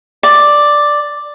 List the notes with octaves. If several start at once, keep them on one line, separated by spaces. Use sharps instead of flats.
D5